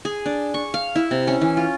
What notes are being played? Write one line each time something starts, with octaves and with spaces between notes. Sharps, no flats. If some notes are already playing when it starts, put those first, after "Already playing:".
G#4
D4
C#6
F5
E4
C3
C#4
E3
F4